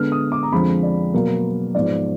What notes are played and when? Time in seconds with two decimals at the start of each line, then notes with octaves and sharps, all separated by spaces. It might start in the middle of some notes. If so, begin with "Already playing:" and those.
Already playing: D3 G#3 B3 F6
0.12 D#6
0.32 D6
0.43 A#5
0.52 F2 D3 F3 G#3 B5
0.83 D5
1.14 B2 F#3 A#3
1.75 G#2 F3 B3 D5